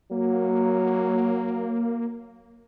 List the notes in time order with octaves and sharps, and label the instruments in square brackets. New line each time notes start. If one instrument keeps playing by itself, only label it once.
[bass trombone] F#3 [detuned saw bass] A#3